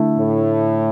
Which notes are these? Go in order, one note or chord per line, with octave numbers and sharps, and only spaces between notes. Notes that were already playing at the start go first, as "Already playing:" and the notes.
Already playing: D3 A3 E4 A4
A2